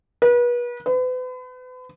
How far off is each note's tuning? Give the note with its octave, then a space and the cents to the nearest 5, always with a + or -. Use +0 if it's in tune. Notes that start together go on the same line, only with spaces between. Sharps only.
B4 -35
B4 +40